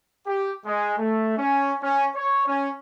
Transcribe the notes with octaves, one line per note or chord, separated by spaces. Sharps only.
G4
G#3
A3
C#4
C#4
C#5
C#4